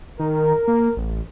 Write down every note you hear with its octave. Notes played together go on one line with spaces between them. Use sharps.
D#3 A#4
A#3
A1